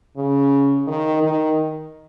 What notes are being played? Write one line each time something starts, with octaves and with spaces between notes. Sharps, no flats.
C#3
D#3
D#3